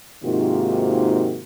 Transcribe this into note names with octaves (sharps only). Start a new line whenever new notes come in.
G#2 C3 D#3 A#3 F4 F#4